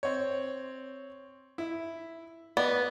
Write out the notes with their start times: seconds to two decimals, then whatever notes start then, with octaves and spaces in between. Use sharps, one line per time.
0.03 C4 C#5
1.58 E4
2.57 B3 D5